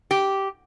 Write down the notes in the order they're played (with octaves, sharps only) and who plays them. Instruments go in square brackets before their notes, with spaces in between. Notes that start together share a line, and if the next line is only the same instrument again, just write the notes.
[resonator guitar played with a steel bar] G4